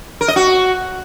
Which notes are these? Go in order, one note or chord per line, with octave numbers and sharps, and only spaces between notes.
A#4
D#5
F#4